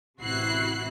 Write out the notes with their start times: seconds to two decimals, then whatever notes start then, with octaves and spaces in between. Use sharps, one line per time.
0.21 A1 C3 E4 F#4 F#6 C7